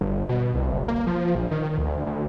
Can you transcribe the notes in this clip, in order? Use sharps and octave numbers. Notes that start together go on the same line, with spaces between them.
G1
B2
C2
F#1
A#3
F3
A#1
D#3
D2
D2